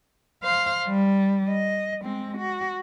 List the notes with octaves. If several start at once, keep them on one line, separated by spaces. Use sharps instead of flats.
C5 F5
G3
D#5
G#3 C4
F#4